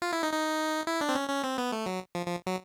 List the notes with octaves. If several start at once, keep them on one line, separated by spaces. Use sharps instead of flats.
F4
E4
D#4
D#4
E4
D4
C4
C#4
C#4
C4
B3
A3
F#3
F3
F3
F#3